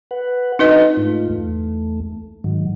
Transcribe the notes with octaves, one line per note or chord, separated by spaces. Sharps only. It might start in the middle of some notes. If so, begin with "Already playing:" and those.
B4 F#5
C4 D4 D#4 F#4 B4 D#5
G#2 A3 F4
E2 A3
G#2 D#3 F#3